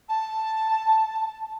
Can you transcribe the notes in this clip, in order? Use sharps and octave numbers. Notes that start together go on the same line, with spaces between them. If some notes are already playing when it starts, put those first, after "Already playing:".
A5